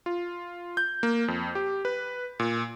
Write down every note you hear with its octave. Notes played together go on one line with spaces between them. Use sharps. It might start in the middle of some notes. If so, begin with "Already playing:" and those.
F4
G6
A#3
F2
G4
B4
A#2